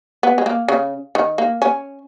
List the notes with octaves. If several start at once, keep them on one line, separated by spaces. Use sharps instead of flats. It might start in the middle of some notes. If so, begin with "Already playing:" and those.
B3
G#3
A#3
C#3
D#3
A#3
C#4